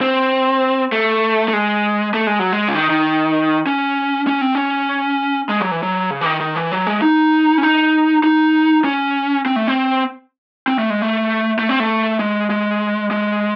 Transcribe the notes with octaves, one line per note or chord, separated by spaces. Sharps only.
C4
A3
A3
G#3
A3
G#3
F#3
G#3
C#3
D#3
D#3
C#4
C#4
C4
C#4
G#3
F#3
E3
F#3
C#3
E3
D#3
D#3
E3
F#3
G#3
D#4
C#4
D#4
D#4
C#4
C4
A3
C4
C4
A3
G#3
A3
A3
C4
A3
G#3
G#3
G#3